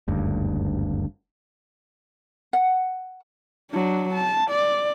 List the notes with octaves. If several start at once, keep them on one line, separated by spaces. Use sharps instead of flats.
F#1 D2 G2
F#5
F#3 D4
A5
D5